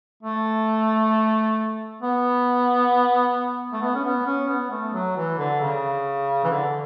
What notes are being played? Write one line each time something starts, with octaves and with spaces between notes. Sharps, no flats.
A3
B3
A3
B3
C#4
B3
C#4
B3
A3
F#3
E3
D3
C#3
E3
D3